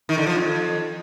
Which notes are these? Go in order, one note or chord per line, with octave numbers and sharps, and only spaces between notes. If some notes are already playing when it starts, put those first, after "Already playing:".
D#3
D3
F3
F2